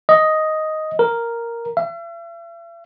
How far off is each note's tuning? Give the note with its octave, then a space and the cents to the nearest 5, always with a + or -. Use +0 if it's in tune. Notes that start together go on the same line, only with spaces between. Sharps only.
D#5 +5
A#4 +0
E5 +45